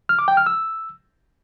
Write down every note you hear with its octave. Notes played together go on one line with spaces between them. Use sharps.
F6
D6
G5
F6
E6